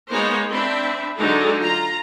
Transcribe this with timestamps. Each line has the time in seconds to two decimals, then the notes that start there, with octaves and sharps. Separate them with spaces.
0.11 G#3 A#3 B3 D#4 C5 C#5
0.49 C4 D4 E5 B5
1.16 D3 F#3 G#3 D#4 A4
1.60 F4 A#5